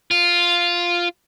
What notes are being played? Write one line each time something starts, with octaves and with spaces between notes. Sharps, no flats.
F4